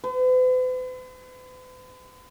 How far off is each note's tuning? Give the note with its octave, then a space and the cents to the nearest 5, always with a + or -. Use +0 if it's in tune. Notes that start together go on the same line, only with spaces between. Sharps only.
B4 +45